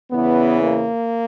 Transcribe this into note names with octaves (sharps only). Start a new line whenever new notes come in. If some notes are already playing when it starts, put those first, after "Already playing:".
E2 C#3 E3 B3
A#3